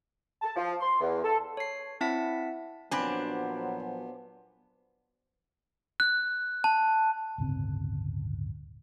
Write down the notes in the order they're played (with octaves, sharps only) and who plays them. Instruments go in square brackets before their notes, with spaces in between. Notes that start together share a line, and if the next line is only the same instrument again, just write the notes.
[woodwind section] A5
F3
C6
E2
A4
[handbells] C#5 C7
C4 E4 E5 F#5 A5 B6
[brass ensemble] A#2 F3 F#3 [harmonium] B3 [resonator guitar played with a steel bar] C4 D4 [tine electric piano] G#5 B5
[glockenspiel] F#6
A5
[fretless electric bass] D1 G1 C#3 C4